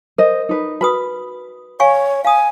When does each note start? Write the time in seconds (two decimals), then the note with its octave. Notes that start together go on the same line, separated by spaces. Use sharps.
0.18 A#4 C5 D#5
0.49 D#4 B4
0.81 F#4 B4 B5 D#6
1.80 C#5 F5 G#5 C#6
2.25 F5 G#5 D#6